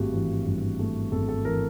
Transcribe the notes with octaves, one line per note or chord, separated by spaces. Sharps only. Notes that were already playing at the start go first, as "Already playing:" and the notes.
Already playing: G#1 G2 A3 F#4 G4
E3
G2
A3
G#1 A4
A4
E3 A#4